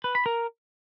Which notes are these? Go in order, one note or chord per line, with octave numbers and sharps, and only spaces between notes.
B4
B5
A#4